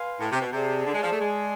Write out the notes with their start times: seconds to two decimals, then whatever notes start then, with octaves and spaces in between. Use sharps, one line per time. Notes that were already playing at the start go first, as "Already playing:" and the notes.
Already playing: B4 F5 G#5 C6
0.20 A2
0.31 C3
0.41 B2
0.52 C3 G#4 D5 A5
0.86 D3
0.94 G#3
1.03 F3
1.12 A3
1.21 G#3